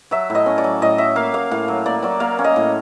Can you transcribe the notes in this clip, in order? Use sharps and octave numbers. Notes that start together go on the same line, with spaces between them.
F#3 E5
A2
D#5
C#4
D5
F#3
A2 D#5
F#3 E5
A#3 F5
A#3 F5
A2 F5
F#3
A#3 D5
F#3 D5
A#3 F5
C#4
D#5
A2